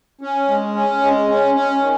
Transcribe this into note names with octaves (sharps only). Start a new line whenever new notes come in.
C#4
G#3
C#4
G#3
C#4
C#4
D#3